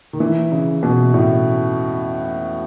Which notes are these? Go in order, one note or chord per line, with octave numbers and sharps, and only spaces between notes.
D#3
E3
C#3
B2
A2